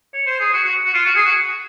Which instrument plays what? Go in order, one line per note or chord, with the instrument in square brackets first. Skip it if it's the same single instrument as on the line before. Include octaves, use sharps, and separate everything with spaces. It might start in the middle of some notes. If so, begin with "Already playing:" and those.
[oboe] C#5
C5
G#4
F#4
F#4
F#4
F4
F#4
G#4
F#4